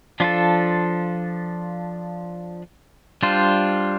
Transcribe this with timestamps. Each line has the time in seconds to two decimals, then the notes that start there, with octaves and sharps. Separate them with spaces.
0.20 F3 D4 F4 A4
3.23 G3 D4 F4 C5